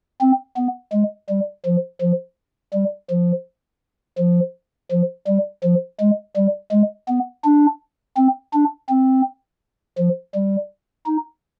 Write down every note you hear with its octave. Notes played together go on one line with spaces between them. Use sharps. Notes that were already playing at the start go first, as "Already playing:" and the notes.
C4
B3
G#3
G3
F3
F3
G3
F3
F3
F3
G3
F3
G#3
G3
G#3
B3
D4
C4
D4
C4
F3
G3
D#4